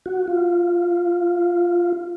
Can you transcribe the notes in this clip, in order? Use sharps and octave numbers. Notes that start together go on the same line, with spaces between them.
F#4
F4